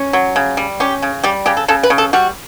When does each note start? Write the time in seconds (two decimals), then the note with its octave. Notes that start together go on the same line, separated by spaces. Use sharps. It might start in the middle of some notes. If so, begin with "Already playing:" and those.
Already playing: C#4
0.13 F#3
0.36 C#3
0.57 G3
0.80 C#4 G4
1.02 C#3
1.24 G3 G4
1.46 C#3 G4
1.57 A4
1.68 C#3 A4
1.83 B4
1.90 C#3
1.98 A4
2.13 G3 F#4